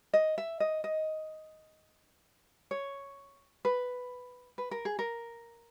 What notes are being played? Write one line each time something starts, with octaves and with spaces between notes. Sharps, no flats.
D#5
E5
D#5
D#5
C#5
B4
B4
A#4
G#4
A#4